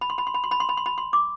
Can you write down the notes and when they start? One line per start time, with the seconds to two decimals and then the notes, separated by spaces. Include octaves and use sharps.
0.01 B5
0.10 C6
0.18 B5
0.27 C6
0.34 B5
0.44 C6
0.51 B5
0.60 C6
0.69 B5
0.77 C6
0.86 B5
0.98 C6
1.13 D6